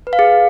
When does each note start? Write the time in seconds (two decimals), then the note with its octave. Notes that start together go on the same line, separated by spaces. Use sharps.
0.07 B4
0.13 F5
0.19 G#4